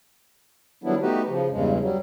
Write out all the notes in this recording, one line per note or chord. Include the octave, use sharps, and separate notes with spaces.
D#3 F#3 G3 B3 D4 E4
A3 B3 D#4 F#4 G4 B4
C#3 F3
E2 G2 C#3 G#3
F#3 G3